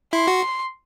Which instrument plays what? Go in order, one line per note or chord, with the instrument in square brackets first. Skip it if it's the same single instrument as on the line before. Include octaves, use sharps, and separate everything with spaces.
[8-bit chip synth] E4 [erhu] C6
[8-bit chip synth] F#4